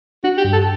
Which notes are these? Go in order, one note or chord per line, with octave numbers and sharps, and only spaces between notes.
D4 F#4
G4
G2
A4